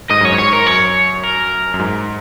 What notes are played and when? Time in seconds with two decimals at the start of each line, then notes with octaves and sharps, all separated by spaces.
0.10 G#2 D#5
0.21 F#2 C#5
0.32 G#2
0.39 C#5
0.53 A#4
0.67 F#2 C#5
1.23 A#4
1.74 F#2
1.79 G#2